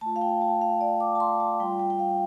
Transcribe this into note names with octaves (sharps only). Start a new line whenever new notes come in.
A3 F4 A5
F5
G5
A5
F5
D5
D6
A5
C6
A5
G3 F4 G5
G5
G5
F5